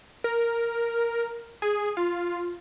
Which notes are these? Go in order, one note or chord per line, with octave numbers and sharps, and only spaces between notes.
A#4
G#4
F4